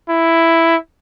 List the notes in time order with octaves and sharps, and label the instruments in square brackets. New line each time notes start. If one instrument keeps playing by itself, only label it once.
[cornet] E4